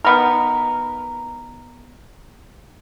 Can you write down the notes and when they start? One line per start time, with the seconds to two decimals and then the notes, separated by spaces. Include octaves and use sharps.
0.05 D#3 B3 A#4